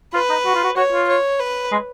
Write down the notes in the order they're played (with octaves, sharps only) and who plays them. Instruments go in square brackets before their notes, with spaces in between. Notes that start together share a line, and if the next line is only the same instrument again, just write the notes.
[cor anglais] F4 [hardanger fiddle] B4
[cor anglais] D#4
F#4
F4
F#4
[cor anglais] F#4 [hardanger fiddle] C#5
[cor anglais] F4
[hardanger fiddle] C#5
B4
[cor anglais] G#3